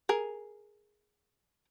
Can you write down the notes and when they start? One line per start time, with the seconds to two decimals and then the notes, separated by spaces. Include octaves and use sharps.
0.09 G#4 A#4